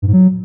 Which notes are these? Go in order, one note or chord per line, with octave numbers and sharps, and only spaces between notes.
G2
G#2
F#3